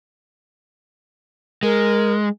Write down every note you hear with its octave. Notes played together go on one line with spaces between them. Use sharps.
G#3 A#4